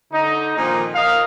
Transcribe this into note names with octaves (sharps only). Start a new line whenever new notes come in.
D3 D#4
A#2 D#3 F3 C4 D#4
A#4 D#5 F5